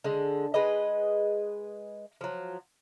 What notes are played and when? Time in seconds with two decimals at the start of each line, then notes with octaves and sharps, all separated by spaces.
0.04 D3 G#3
0.54 G#3 G#4 B4 D#5
2.21 F3 F#3